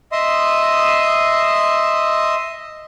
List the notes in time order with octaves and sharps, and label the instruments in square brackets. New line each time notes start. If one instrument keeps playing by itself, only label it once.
[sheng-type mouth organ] D#5 E5 C6 D#6